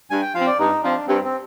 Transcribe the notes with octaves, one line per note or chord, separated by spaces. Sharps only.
G2 G#5
G5
F3 C4 F5
D5
G2 D#4
F3 C4 D4
G2 C4
C4